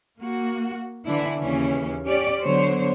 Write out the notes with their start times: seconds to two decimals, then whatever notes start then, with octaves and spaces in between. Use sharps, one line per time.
0.19 A#3 F#4
1.05 D3 E3 D4 E4
1.40 D#2 C#3 E3 C#4
2.05 C#4 G4 D5
2.41 D3 F#3 B3 C5 C#5